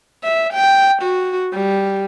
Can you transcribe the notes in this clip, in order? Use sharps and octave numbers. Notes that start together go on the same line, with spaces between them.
E5
G5
F#4
G3